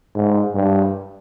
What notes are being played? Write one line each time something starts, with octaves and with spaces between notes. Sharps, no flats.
G#2
G2